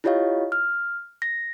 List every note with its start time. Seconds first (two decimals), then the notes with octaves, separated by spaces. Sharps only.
0.04 E4 F4 G4 C#5 D#5 F5
0.52 F6
1.22 A#6